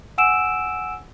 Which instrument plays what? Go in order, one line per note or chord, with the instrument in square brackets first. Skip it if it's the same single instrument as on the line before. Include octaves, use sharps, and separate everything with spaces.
[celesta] F#5 G#5 E6 D7 E7